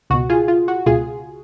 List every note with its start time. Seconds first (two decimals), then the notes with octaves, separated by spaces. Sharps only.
0.10 C#2 B2 F#4
0.29 F4 G#4
0.48 F4
0.68 F#4
0.86 C#2 B2 F4 G#4